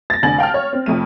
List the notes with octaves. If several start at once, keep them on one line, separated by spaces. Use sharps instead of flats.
A6 A#6
F1 D3 G#5 A6 F#7
F5 G5 A5 F6
C#5
C4
F1 F2 A3 D#7